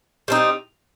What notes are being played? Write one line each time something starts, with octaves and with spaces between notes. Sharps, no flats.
G3 C4 D#4